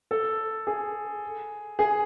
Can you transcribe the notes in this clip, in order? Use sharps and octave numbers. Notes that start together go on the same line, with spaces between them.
A4
G#4
G#4